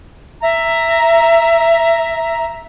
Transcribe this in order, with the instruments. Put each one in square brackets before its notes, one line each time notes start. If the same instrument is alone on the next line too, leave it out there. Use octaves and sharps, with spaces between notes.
[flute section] E5 A#5